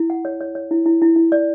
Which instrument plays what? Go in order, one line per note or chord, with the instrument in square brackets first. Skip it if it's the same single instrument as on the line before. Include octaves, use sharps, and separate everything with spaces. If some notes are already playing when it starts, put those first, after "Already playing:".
Already playing: [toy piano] E4
F#5
C#5
C#5
C#5
E4
E4
E4
E4
D5